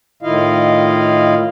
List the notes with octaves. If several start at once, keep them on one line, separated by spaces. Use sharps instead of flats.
A2 D#3 E4 F4 D#5 F5